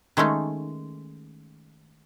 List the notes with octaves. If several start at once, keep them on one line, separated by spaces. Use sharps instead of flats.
D#3 G#3 A3 C#4 D#4